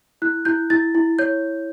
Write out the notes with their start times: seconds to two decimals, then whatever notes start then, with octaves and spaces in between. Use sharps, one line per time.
0.22 E4 F#6
0.45 E4 G6
0.70 E4 A6
0.95 E4
1.19 C#5 G6